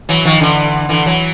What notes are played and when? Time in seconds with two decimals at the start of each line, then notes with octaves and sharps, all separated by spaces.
0.09 E3 F#3
0.25 D#3 F3
0.41 D3 E3
0.89 D3 E3
1.06 E3 F#3